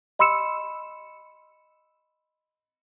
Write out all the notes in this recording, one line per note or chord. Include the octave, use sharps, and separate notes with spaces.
D#5 B5 C6 E6 C#7 E7